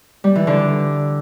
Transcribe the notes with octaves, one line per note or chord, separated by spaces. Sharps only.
G3
E3
D3